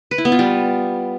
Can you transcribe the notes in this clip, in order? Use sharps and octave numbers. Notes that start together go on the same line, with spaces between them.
B4
E4
B3
F4
G3